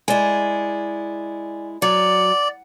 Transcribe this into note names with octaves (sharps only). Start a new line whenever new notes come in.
G#3 E4 D5 G#5
F#3 D5